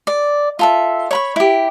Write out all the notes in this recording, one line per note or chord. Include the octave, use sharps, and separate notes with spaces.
D5
F4 A4 E5
C#5 B5 C#6
E4 G4